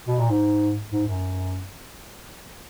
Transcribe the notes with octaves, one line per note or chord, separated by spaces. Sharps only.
B2
A#2
G#2
G#2
F#2